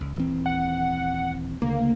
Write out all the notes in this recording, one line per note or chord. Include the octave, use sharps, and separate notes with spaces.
C#2
D#1 E3 C4
F#5
D2 C#3 A#3